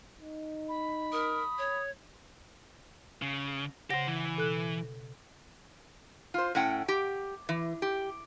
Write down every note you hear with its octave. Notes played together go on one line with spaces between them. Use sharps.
D#4
B5
A#4 D#6
C#5
C#3
C#3 G4 C5 F#5 A#6
E3
B2 A4 F#6
F4 C5
A2 C#4 F#5 G5
G4
E3
G4